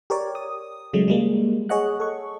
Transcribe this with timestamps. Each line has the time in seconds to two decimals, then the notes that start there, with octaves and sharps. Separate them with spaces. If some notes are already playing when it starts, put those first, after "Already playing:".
0.10 G4 A#4 C#5 D5
0.35 D#6
0.93 C#3 F#3 G#3 A3
1.08 G3 G#3 A#3
1.69 G#4 C#5 D#5 F#5 F#6
2.00 A4 C#6